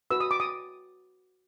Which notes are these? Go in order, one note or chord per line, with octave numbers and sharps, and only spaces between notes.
F#4 B4 E6
D#6
D6
D#6